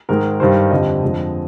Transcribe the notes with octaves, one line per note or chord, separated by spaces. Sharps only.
G#2 D#3 G#3 A#4
G2 D#3 G3 C5
F2 D3 G3 D#5
F2 D3 F3 G#3